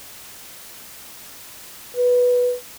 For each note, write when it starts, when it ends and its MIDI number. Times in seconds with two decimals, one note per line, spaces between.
1.96 2.55 71